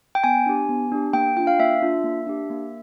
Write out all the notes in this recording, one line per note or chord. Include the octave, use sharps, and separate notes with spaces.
G5
B3 G#5
D4 G4
B3
D4 G4
A#3 G5
D4 F4 G5
F5
A#3 E5
D4 F4
A#3
D4 G4
A#3